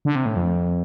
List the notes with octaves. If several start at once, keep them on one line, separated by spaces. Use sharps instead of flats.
D3
C3
A2
F2